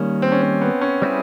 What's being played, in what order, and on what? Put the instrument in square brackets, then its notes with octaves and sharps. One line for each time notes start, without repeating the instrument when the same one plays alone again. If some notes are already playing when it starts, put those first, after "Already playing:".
Already playing: [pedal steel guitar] D#3 G3 A#3 [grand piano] C#4
[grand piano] C4
C#4
C4
B3
C#4
[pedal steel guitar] G3 C4 E4 G#4